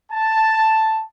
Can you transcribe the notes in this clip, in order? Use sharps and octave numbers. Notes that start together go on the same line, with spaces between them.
A5